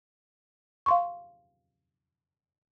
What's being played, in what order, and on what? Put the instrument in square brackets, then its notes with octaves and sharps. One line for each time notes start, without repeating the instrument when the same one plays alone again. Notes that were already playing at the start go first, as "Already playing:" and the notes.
[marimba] F5 C6 C#6